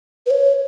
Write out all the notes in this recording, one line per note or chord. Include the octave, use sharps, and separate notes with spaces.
B4
C#5